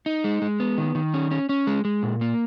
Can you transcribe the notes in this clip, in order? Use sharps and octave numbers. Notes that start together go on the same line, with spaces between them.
D#4
G#3
G#3
B3
D#3
D#3
C#4
C#4
C#4
G#3
G#3
A#2
A#3